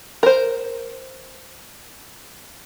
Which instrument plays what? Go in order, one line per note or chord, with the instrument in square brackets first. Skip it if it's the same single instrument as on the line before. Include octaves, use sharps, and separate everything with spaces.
[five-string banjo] A#4 C5